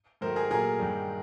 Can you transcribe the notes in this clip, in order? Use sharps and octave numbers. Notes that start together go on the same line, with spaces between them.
G#2 D#3 F#3 A3 A#4 C5
G#4 A#4
A#2 F#3 A3 G#4 A#4
G2 D#3 G3